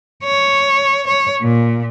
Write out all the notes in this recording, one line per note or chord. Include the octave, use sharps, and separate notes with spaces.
C#5
C#5
A#2